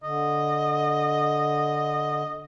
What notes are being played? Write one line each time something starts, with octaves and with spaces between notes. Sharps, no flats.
D3 D#5